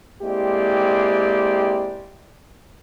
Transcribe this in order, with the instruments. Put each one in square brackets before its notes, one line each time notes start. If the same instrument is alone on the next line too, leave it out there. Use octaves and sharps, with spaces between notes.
[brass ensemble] G#3 A#3 C4 E4 G4 D5